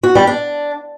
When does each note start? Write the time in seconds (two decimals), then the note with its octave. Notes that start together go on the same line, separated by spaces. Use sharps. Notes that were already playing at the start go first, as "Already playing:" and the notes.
0.03 F#4
0.15 G3
0.27 D4